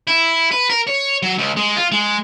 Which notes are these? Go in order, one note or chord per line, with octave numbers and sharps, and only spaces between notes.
E4
B4
A#4
C#5
F#3
C#2
G#3
F4
G#3